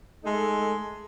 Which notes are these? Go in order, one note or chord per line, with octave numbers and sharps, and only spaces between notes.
G#3 A3 D#4 A4